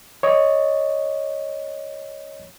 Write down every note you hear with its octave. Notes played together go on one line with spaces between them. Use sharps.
C#5 D#5